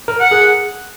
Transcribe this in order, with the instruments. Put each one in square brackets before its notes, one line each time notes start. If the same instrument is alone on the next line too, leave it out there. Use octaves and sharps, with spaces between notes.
[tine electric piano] A#4
[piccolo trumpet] F#5
[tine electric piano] G#4